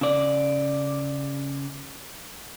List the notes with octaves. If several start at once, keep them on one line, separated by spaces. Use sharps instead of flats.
C#3 D5